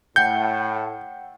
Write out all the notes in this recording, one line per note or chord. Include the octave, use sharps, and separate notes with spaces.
A2 F#5 G5 G6 C#7